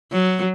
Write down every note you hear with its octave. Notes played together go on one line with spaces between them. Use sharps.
F#3